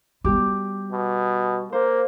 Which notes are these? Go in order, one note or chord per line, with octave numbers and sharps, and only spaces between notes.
G3 B3 G4 D6
B2
A#3 C5